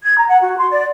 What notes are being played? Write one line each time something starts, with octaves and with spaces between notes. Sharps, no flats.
G#6
A#5
F#5
F#4
C6
D5